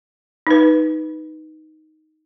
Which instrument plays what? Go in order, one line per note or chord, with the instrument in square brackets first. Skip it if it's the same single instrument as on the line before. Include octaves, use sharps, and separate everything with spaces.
[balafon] D#4 B4